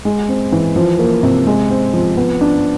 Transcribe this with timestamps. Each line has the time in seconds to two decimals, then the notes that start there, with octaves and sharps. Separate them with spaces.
0.05 G#3
0.29 C4
0.52 E3
0.76 F3
0.99 A#3
1.23 C3
1.47 G#3
1.70 C4
1.94 F3
2.17 B3
2.41 D4